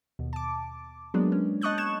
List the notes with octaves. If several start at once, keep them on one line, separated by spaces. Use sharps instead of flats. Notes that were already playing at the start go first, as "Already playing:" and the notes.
D#2 B2
A5 D6
F#3 G#3 A#3 B3 D4
C#4
D#5 A5 C#6 D#6 F#6 G6
C#6 G#6 E7